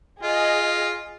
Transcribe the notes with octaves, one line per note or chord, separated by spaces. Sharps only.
F4 G#4 D#5